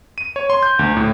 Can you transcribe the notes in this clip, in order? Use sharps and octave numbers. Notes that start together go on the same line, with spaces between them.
D#7
C#5
C6
G6
D2
A2